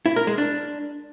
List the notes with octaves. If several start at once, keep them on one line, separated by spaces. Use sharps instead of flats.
E4
A#4
G#3
D4